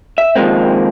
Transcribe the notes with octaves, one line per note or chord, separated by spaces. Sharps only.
E5
D#3 F3 F#3 G#3 A#3 C4